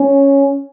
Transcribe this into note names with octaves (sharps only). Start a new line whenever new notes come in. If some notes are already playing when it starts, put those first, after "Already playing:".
Already playing: C#4